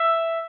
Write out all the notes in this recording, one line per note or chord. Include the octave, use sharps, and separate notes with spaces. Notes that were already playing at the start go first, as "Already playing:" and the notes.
Already playing: E5